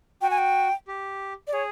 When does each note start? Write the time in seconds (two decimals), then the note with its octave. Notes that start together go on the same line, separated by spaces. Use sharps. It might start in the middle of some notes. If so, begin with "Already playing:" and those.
0.21 F#4 G5
0.30 G#5
0.38 G5
0.87 G4
1.47 D5
1.53 G#4 C#5